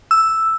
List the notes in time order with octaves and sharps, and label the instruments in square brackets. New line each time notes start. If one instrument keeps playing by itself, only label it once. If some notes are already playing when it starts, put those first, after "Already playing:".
[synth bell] E6